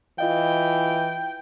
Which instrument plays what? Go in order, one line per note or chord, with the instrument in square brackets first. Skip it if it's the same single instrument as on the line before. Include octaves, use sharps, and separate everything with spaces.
[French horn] E3 [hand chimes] F4 D#5 F5 [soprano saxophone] G5